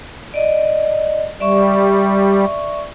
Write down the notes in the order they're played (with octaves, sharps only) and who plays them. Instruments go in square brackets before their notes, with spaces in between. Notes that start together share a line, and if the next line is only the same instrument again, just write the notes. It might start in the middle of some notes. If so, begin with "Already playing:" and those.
[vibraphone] D5 D#5
[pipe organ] G3 [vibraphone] D5 E5 C#6